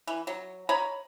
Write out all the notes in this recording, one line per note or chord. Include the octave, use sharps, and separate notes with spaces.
E3
F#3
C#5 D#5 A#5 B5